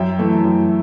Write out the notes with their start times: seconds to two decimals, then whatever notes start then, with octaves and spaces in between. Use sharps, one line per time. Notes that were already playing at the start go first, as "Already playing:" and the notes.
Already playing: F#2 E5 G5
0.19 E3 A3
0.44 F#2